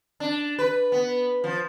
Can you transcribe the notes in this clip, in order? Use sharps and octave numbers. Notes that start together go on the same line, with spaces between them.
D4
B4
B3
F3